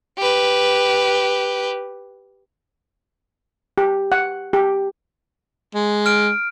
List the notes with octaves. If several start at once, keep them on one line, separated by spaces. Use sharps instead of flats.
G4 B4
G4
F#5
G4
G#3
F6 D7